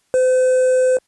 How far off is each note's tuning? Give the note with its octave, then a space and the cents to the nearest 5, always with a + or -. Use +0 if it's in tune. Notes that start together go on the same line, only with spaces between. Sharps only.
C5 -40